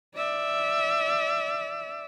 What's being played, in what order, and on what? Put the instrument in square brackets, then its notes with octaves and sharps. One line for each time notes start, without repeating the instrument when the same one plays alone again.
[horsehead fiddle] D5 E5